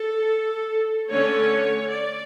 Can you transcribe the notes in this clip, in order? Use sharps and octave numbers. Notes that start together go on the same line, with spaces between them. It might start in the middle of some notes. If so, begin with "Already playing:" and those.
Already playing: A4
D3 A3 C#4 C#5
D5